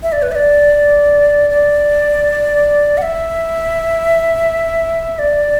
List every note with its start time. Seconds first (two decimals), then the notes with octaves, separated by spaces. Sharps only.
0.03 E5
0.12 D5
0.22 B4
0.32 E5
0.35 D5
1.50 D5
2.98 F#5
3.02 E5
5.19 D5